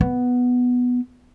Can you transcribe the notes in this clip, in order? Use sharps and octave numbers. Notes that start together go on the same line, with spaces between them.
B3